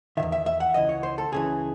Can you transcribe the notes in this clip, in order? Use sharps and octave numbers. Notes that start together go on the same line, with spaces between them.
C3 D#3 E5
E2
E5
E5
F#5
C#2 C#3 E3 D#5
C#5
C5
A4
C#2 C#3 E3 G#4